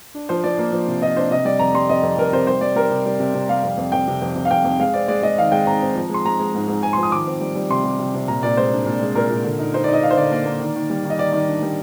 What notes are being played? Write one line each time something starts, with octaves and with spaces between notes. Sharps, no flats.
D4
F3 C5
F3 D5
A#3
F3
C3
F3 D#5
D4 C5
C3 D#5
G3 D5
F2 A#5
G3 C6
F2 D#5
F2
F2 A#4
C3 C5
G3 C5
G3 D5
G3 A#4
C3
G3
C3
C3
G3 F5
F2
F2
F2 G5
C3
F2
C3
F5
F2 G5
F2
G#3 F5
C4 D5
G#3 D5
G#3 D#5
D#3 F5
G#3 G5
C4 A#5
C4
F3
G#3 C6
G#3 A#5
G#3
G#2
G#2
G#2 G#5
C6
F3
D#6
D#3 D6
C4
G3
G3
C3 C6
G3
C3
C3
A#2 A#5
A#2 D5
G#3 C5
D4
A#2
G#3
A#2 A#4
A#2
D3
D#4
D#4 C5
D5
D#4
D#5
D#4 F5
C5
D3 D5
A#3 D5
A#3
D#3
D#3
G3
D#3
D#5
D#3 D5
D#3 D5
D4
G3